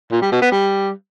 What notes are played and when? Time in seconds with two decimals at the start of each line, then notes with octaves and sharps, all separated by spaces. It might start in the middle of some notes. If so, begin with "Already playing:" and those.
0.12 A#2
0.22 G3
0.32 B2
0.42 B3
0.52 G3